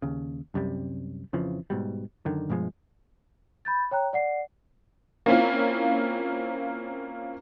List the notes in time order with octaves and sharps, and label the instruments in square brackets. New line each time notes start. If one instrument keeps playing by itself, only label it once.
[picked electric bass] D#2 C#3
C2 F#2 C3 G3
F2 C#3 E3 F3
G#2 B2 G3
F#2 D3 D#3
G2 B2 F3 G#3
[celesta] B5 G6 A6
C#5 G5 A#5 F#6
D5 F#5 C7
[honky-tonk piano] A#3 C4 C#4 E4 F4